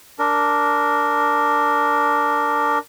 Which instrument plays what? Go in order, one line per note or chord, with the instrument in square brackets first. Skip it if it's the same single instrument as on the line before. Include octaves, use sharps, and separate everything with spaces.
[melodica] D4 A#4